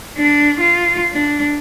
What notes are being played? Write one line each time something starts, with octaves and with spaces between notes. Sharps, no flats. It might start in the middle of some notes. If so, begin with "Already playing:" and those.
D4
F4
D4